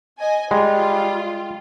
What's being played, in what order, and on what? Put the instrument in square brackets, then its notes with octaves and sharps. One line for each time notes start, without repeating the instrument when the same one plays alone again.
[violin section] D#5 G#5
[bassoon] G3 [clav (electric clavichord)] G#3 [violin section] F4